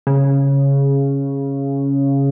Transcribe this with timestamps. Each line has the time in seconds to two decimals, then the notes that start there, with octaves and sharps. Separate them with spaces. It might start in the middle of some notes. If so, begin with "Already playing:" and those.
0.07 C#3